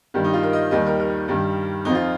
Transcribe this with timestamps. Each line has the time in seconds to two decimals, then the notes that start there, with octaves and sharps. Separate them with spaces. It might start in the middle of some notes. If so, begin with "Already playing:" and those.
0.14 G2 D#3 G3
0.24 D#4
0.33 F4
0.43 A#4
0.53 D#5
0.71 D#2 D#3 G3 D#5
0.86 A#4
1.00 A#4
1.28 G2 D#3 G3
1.85 F2 F3 D#4
1.95 F4